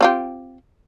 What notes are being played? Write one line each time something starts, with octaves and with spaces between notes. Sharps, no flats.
C4 F4 G4